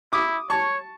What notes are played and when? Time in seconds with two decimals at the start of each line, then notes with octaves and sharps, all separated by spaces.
0.13 E4 D6 D#6
0.50 C#5 A5 C#6